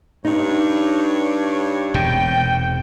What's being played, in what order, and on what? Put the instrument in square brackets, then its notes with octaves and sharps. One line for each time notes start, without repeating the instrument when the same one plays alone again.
[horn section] G2 C#5 [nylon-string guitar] D#4
[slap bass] E1 G#2 C3 [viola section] G5